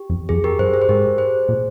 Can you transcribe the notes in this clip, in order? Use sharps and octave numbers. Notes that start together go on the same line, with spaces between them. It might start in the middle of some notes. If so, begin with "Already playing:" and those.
Already playing: G4
F2
F2 G#4
G4 A#4
G2 G#4 C5
G#4
C5
G#2 G4 A#4
G#4 C5
A#2